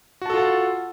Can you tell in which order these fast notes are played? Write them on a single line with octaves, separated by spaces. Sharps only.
F#4 A5 A4 F4 F#5